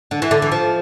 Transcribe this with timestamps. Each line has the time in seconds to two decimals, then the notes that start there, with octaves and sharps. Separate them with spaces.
0.11 D3
0.22 E3
0.31 D3
0.42 E3
0.52 F3